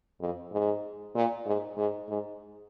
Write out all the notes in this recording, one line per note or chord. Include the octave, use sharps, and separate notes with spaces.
F2
G#2
A#2
G#2
G#2
G#2